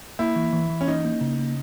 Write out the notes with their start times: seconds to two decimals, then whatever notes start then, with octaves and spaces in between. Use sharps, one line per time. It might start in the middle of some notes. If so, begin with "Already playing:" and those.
0.19 A#3 E4
0.36 E3
0.53 E3
0.70 E3
0.81 C#4
0.87 A#3 D#4
1.05 A#3
1.21 C#3
1.39 A#3